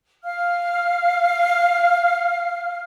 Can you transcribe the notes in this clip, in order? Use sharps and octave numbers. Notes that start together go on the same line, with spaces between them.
F5 F6